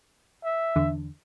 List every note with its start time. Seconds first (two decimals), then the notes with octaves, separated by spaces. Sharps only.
0.44 E5
0.76 E2 D3